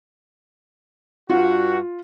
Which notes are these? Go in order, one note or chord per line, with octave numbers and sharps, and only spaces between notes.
G2 F4 F#4